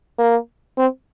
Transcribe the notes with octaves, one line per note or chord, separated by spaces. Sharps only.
A#3
C4